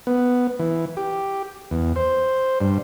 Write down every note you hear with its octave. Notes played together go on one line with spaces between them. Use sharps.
B3
E3
G4
E2
C5
G2